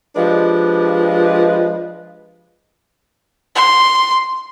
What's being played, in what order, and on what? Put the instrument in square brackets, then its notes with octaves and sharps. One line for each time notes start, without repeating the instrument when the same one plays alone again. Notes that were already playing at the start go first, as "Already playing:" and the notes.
[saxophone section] F3 G#3 D4 G4 B4
[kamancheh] C6